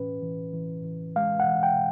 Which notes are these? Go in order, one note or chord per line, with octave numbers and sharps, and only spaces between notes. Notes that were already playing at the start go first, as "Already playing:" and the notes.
Already playing: A2 E3 C#4 B4
E3
E3
E3
G#3 F5
F#5
E3
G5